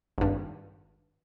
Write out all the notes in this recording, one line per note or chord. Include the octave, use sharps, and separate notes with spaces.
G#1 G2